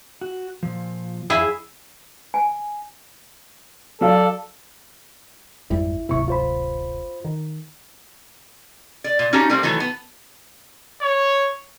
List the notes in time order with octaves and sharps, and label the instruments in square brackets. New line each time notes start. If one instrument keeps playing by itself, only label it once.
[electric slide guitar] F#4
A#2 F3
[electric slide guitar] F2 F5 G5 [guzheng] E4 G#4
[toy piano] G#5
[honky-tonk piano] F#3 F5 [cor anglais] A4 [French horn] D5
[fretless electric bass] G#1 F2 G3 [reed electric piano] E4
[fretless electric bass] D1 G#1 C3 [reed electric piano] E4 C#6
[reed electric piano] F4 C5 B5
[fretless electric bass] D#3
[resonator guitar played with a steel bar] D5
A#2
C#4 D#4 F#4 G4 A5
G3 A3 A#3 C4
D#3 E3 F#3 A3
B3
[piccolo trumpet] C#5